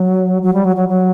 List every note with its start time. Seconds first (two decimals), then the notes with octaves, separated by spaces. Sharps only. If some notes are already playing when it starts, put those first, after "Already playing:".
Already playing: F#3
0.42 F#3
0.54 G3
0.65 F#3
0.76 F#3
0.89 F#3